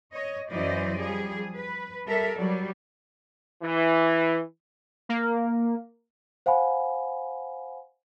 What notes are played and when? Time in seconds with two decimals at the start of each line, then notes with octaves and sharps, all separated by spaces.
0.13 C#5 D#5
0.50 F#2 E3 F#3 C5 D5 D#5
0.98 F3 G3 G#4
1.55 B4
2.06 G3 A4 A#4 E5
2.39 F#3 G3 D5
3.62 E3
5.09 A#3
6.46 C5 F5 F#5 G#5 B5